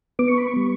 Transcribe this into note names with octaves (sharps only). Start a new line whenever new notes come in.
B3 D6
C#6
B5
C#6
G3